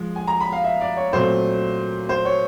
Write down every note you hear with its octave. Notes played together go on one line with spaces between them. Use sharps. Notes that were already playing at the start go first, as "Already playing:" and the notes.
Already playing: F3 G#3
G#5
A#5
B5
F5
E5
D5
C#5
A#2 F#3 A3 C4 C5
C5
C#5